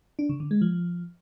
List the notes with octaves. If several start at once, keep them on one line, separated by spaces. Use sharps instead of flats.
D4
C#3
D3
G#3
F3